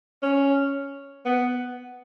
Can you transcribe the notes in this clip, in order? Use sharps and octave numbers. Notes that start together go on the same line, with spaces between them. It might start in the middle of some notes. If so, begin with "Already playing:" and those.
C#4
B3